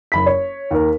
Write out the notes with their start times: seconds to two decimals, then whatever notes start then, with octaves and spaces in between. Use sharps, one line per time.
0.12 F#1 B5 B6
0.26 C#5
0.71 D#2 A#4